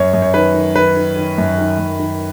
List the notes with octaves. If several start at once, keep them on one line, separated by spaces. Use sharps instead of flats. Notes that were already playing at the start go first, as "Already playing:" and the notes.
Already playing: F#2 C#5
F#2
C#5
D#3 B4
D#3
D#3 B4
D#3
D#3
F#2
D#3
F#2
D#3